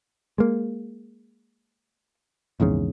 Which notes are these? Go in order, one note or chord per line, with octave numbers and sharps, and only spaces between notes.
G#3 A#3
A#1 E2 G#2 C#3